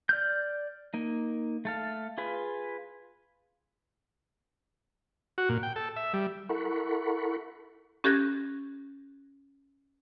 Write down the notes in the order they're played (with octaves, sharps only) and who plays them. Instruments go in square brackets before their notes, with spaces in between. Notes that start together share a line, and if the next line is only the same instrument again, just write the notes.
[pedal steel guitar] D5 F6 G6
A#3 D#4
A3 A4 F5
F4 G#4 B4
[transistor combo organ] F#4
A#2
G5
A4
E5
G3
[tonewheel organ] E4 A4 A#4 F#5 B5 C#6
[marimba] C#4 G4 A4 F#6 G#6 A#6